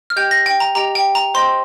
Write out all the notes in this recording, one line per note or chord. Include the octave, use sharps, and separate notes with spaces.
F6
G4 D#5 G5 G6
A#6
G5
A#5
G4 D#5 G5 A#5
G5
A#5
C5 D#5 G5 C6